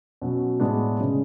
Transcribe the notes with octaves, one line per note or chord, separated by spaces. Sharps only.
B2 F#3 C#4 F#4
A2 G#3 B3 D4
C#3 G#3 C#4